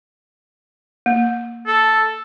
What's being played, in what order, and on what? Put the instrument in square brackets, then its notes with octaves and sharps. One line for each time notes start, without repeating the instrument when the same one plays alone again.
[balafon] A#3
[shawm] A4